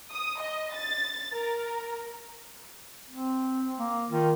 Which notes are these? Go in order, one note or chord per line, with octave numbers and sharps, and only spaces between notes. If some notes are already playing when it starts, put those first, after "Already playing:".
D#6
D#5
A6
A#4
C4
A#3
D#3 F4